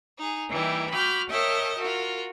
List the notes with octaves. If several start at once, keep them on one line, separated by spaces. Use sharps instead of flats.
D#4 G#4
E3 G3 A#3 D#4 E4
F#4 B5 D6 F6 G6
A#4 C#5 D#5 E5 G5 A5
F4 F#4 A#4